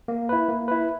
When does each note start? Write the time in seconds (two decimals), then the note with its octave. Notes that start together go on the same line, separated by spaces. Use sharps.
0.08 A#3
0.29 E4 B4
0.49 A#3
0.68 E4 B4